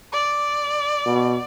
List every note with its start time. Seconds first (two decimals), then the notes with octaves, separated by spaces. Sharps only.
0.13 D5
1.06 B2